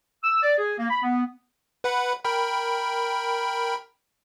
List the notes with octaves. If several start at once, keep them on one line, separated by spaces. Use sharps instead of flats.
E6
D5
G#4
A#3
B5
B3
B4 F#5 B5
A#4 G5 B5